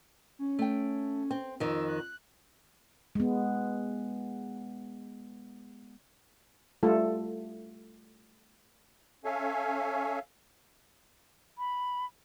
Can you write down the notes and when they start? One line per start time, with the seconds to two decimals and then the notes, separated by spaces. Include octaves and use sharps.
0.39 C#4
0.59 A3 G5
1.31 C4
1.60 F2 D#3 E6
1.88 F#6
3.15 G#3 B3
6.83 G3 A3 F4 A4
9.25 C#4 A4 C#5 E5 F5 G#5
11.58 B5